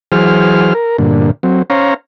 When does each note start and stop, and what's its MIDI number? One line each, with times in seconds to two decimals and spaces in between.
0.12 0.74 52
0.12 0.74 54
0.12 0.74 68
0.12 0.74 72
0.12 0.74 89
0.75 0.97 70
0.98 1.31 43
0.98 1.31 46
0.98 1.31 50
1.43 1.62 54
1.43 1.62 60
1.70 1.94 61
1.70 1.94 72
1.70 1.94 73
1.70 1.94 77
1.70 1.94 82